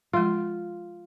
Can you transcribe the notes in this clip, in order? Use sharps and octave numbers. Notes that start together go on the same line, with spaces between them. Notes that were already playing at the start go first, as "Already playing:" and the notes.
F3 G#3 F4